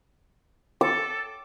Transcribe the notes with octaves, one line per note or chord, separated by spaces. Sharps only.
A4 D6